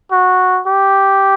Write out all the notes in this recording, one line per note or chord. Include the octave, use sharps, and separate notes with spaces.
F#4
G4